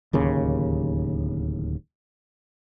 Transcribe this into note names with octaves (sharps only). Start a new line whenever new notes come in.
D1 D#2 C#3